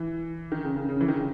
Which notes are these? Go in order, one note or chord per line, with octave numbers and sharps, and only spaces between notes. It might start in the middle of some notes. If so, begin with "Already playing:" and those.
Already playing: E3
D#3
C#3
C#3
C#3
E3
D#3
C#3